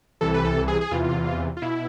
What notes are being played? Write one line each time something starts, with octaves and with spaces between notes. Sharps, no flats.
C2 C3 E3 A4
B4
A4
G#4
G#4
E2 C3 E3 F4
F4
B2 E4